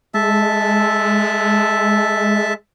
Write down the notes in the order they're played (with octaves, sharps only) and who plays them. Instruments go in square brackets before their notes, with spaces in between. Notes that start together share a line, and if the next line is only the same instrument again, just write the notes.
[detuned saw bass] G#3 [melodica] A4 E5 A5